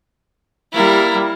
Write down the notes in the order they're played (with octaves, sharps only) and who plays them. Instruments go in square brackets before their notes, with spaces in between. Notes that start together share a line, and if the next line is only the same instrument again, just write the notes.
[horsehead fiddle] G3 A#3 [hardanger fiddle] E4 A#4